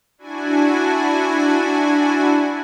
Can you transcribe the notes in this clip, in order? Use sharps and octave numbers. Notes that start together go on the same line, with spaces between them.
D4 E4 F#4 G#5